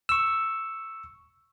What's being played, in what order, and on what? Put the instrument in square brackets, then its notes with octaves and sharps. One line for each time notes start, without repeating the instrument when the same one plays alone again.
[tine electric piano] C#6 E6